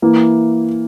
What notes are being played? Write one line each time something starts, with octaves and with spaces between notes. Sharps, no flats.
E3 A#3 E4